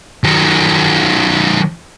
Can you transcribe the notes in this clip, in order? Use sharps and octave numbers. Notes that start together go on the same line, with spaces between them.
D#3 F#3